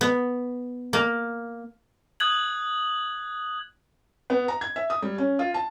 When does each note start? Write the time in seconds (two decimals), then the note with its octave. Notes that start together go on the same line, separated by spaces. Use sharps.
0.01 B3
0.93 A#3
2.20 D#6 F#6 G#6 F#7
4.30 B3
4.48 A#5
4.61 G#6
4.76 E5
4.90 D#6
5.02 G3
5.18 C#4
5.39 F4
5.54 A5